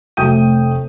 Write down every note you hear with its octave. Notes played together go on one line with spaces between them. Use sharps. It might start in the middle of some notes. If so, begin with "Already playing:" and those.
F1 A3 G5 D#6 G6 D#7